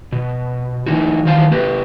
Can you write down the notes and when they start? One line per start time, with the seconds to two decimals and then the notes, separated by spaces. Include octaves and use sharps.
0.12 B2
0.86 E3 D#4 F#4
1.25 D#3 E3 C5 F5 G#5 A5
1.51 A#3 G4 B4